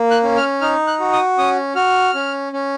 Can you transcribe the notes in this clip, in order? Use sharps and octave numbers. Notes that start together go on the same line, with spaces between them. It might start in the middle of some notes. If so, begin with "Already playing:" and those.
Already playing: A#3
F#6
C#4
F6
D#4 F6
F#6
F#4
D#6
C#4 D#6
F#4 F6
C#4
C#4